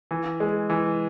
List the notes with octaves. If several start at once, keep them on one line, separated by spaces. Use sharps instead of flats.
E3
G#3
E3